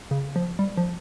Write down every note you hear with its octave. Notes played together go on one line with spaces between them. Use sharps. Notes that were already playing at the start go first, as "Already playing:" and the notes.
C#3
F3
G3
F3